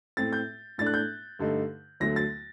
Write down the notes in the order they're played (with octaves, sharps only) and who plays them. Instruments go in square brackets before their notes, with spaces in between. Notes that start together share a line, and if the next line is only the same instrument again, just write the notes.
[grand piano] A2 A3 C4 A6
G6
A2 A3 D4 A6
F#6
G6
G2 D3 A3 D#4
D2 D3 F#3 A3 A#6
A6